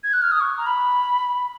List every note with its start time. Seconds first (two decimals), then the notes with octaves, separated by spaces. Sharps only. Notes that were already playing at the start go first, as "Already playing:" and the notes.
0.04 G#6
0.13 F#6
0.22 F6
0.32 D#6
0.41 C#6
0.57 A#5
0.66 B5